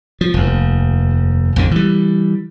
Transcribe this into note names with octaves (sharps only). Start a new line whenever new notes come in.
F3
F1 D#2
A#1 F2 D3
E3 G3